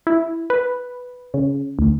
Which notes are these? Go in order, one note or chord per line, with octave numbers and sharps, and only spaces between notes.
E4
B4
C#3
D2